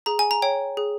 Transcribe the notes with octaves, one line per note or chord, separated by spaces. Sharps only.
G#4 A#5
G#5
A#5
C#5 G5
G#4